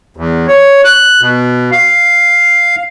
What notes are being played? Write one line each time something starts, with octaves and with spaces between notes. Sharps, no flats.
E2
C#5
F#6
B2
F5